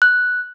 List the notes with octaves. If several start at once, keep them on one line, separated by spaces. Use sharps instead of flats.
F#6